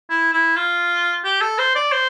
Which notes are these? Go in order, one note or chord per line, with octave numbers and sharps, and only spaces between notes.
E4
E4
F4
G4
A4
C5
D5
C5